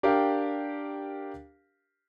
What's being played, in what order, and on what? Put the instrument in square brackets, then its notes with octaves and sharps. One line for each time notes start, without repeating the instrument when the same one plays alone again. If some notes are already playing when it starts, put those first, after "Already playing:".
[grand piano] D4 G4 A#4 F5 G5